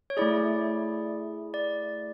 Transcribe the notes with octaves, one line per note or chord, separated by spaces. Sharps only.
C#5
A3 E4 G#4 D5
D5